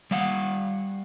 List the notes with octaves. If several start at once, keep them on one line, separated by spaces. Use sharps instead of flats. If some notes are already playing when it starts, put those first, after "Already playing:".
G3 F5 F#5